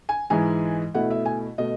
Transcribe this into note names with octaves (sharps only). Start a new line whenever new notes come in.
G#5
G#2 E3 G#3 G#5
B2 A3 E4 F#5
E5
G#5
B2 A3 D#5